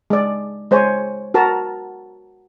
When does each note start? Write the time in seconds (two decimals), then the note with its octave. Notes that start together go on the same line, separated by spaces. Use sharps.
0.10 G#3 D5
0.71 G#3 C5 C#5 G#5
1.34 F#4 A#4 A5 A#5